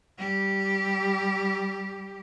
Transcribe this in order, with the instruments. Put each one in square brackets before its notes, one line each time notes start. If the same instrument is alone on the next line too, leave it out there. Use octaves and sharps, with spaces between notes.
[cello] G3 G4